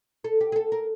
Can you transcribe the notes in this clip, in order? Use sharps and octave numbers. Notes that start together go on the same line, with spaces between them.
A4
G4
G#4
A4
A#4